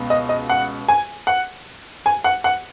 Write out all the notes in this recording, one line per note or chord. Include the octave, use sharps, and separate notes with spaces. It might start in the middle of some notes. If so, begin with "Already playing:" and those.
Already playing: C#2 B2
D#5
D#5
F#5
G#5
F#5
G#5
F#5
F#5